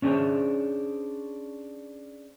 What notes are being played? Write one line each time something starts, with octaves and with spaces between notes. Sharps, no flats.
C#4 D4 G#4 A4 C5 C#5